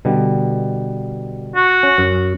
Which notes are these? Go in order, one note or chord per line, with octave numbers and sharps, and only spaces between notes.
B2 D3 G3
F#4
C#4
F#2